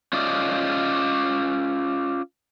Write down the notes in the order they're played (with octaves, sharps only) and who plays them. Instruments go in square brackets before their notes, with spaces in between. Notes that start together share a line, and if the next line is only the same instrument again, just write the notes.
[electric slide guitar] C#4 F4 D5 D#5